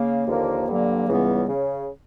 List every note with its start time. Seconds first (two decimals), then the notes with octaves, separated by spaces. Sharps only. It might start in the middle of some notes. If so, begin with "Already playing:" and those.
Already playing: C#3 A#3
0.27 D#2 D3 F3 A#3
0.68 G2 D3 F#3 A#3
1.08 C#2 C#3 E3 G3 B3
1.48 C#3